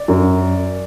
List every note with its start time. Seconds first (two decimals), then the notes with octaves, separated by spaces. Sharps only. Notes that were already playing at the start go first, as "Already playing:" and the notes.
Already playing: D5
0.08 F#2